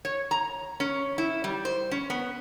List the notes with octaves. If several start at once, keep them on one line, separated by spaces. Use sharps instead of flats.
C#5
A#5
C#4
E4
G3
C5
C#4
B3